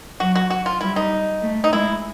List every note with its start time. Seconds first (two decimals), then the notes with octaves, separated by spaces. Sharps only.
0.20 F#3 F#4
0.35 F#4
0.50 F#4
0.66 F4
0.81 G3 E4
0.96 D#4
1.42 A3
1.64 D#4
1.73 G#3 E4